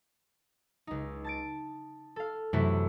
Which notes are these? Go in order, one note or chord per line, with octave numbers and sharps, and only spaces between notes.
C#2 D#4
A5 A6 D7
A4 F5
F#2 C3 E3 A3 E4 F#4